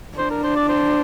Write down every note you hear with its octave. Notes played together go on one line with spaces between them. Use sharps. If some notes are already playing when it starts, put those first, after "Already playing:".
D4 C5
A#4
C5
D5
C5